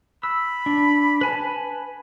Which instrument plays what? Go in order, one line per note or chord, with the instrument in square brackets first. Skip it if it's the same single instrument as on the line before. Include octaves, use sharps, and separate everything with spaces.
[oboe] B5 [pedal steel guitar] E6
[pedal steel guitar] D4
B4 G#5 A5